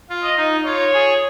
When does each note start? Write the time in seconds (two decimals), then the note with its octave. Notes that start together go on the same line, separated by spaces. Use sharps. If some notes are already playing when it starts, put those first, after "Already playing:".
0.09 F4
0.23 D#5
0.37 D#4
0.65 F4 C#5
0.94 G#4